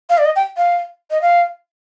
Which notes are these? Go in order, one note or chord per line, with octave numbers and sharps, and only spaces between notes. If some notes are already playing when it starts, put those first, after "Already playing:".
F5
D5
D#5
G5
F5
D#5
F5